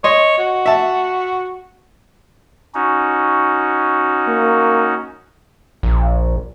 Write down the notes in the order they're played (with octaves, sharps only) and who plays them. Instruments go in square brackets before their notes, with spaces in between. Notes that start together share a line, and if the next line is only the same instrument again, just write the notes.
[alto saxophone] C#5 [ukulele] D#5 [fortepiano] C6
[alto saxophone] F#4
[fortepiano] E5 A5
[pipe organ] C#4 D#4 F#4
[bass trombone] A#3
[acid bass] A#1